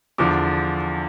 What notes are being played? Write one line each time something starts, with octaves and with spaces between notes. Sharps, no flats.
E2 D3 F3 D6